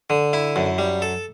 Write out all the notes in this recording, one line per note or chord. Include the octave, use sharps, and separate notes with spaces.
D3
E4
F#2
G3
A4